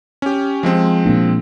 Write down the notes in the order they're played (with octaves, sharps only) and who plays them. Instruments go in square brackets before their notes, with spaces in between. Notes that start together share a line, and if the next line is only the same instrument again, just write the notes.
[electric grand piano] C#4 G4
F3 G#3 C4
[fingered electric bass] A#2 A#3 D4